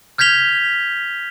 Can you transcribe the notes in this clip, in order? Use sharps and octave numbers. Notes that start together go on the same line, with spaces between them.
F6 G6 G#6 B6 F7 G7